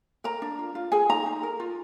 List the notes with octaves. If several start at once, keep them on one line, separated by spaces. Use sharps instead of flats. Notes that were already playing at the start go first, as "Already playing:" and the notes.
A#4 A#5
D4
F4
F4
G#4 G#5
D#4 A#5
D#4
A#4
F4